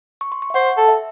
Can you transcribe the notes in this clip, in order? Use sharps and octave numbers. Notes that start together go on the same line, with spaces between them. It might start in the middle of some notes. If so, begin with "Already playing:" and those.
C#6
C6
C#6
E5
C5 F#5
A4
E5